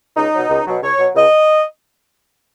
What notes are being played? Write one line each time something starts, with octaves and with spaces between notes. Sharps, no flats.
C#2 D#4
B2 F#3
C#2
B2 F#3
C#2 C#5
B2 F#3
C#2 D#5